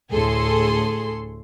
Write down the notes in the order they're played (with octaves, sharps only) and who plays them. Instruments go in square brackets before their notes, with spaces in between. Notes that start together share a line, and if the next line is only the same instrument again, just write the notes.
[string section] D2 A2 G#4 A4 C6